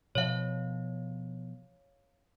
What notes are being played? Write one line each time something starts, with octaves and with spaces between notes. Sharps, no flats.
B2 F3 C#5 F5